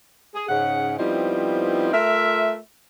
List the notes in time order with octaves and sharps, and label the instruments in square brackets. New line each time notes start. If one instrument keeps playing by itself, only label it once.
[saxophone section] G#4
G#2 C#3 F#5
F3 G3 B3 C4 D#4 E4
A3 F4 A#4 E5